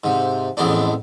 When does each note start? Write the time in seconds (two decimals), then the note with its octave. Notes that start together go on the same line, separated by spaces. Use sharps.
0.04 G#2 C3
0.57 A1 F2 E3 G#3 B3 D4